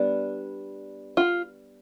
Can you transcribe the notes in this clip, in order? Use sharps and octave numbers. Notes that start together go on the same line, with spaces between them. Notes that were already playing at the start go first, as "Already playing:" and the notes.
Already playing: G3 B3 D4
F4